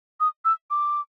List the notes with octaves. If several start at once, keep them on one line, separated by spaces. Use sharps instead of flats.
D#6
E6
D6